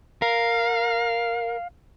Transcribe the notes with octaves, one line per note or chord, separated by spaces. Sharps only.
A#4 F5